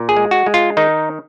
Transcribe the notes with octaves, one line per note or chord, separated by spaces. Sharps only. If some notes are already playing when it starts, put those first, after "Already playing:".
Already playing: A#2
G#4
G#3
F#4
G#3
F4
D#3 D#4